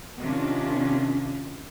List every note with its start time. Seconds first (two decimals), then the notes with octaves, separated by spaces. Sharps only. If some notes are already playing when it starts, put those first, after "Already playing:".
0.21 C3 D#3 C#4 D4 F4